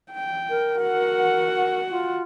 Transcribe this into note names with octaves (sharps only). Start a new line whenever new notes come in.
G5
A#4
F#4 F#5
F4